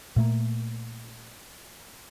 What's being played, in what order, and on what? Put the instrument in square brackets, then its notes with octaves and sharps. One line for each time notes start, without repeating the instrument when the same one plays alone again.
[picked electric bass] A#2 A3 A#3